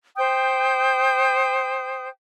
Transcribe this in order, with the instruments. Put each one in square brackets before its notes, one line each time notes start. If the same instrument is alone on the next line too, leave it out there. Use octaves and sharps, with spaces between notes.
[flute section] C5 G5 D#6 G6